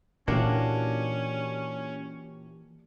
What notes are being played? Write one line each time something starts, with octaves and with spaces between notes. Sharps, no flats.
A#2 E3 A#3 C#4 D4 E4 F#4 G4